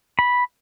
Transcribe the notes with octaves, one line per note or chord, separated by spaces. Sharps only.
B5